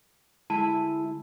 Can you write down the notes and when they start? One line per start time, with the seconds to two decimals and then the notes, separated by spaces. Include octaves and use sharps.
0.50 D2 G#3 E4 A5